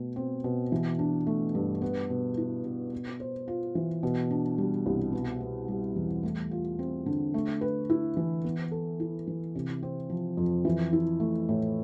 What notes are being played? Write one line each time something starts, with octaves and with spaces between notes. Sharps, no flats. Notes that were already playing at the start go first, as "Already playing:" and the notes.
Already playing: B2 A3
C4
B2
E3
D4
A3
G2
B3
B2
E4
B2
B3
C5
F4
E3
B2
D4
G3
C2
B2
B3
G3
E2
A3
F4
C4
D3
A3
B4
E4
E3
B3
A4
E4
E3
C3
C4
F3
F2
E3
E4
A3
A2